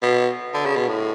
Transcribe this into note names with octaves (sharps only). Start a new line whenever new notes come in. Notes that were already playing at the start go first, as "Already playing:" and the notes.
B2
D3
C#3
B2
A2